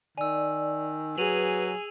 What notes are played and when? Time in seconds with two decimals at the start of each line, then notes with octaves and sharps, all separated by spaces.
0.18 D#3 D5 G#5 E6
1.18 F#3 G#4 B4 D#7 F7 F#7